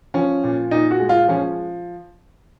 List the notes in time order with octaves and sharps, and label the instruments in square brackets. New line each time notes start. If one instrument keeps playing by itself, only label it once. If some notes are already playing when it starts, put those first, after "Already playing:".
[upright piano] F3 C#4
A#2
A#2 D#4
F#4
G#3
F4
F3 C#4